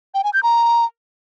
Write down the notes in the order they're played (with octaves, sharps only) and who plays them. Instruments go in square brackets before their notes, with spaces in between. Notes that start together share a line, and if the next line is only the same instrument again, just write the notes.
[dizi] G5
G#5
G6
A#5